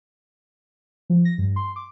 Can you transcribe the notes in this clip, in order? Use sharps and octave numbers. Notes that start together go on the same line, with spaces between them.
F3
A#6
G2
C6
D6